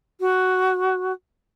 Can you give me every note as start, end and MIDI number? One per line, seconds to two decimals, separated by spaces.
0.20 1.12 66